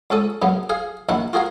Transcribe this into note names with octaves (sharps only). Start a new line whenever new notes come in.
C#2 C#4 A4 D#6
F#2 C#3 B3
G#4 F5
A#1 D#3 E4 F#5
F4 F#4 G#4 A#4 F5